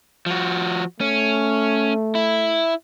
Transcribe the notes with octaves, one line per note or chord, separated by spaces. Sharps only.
F3 F#4
A3 C#4
E4